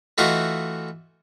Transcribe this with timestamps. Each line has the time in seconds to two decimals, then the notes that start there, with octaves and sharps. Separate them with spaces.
0.18 E3 A3 F4 F#4 D#5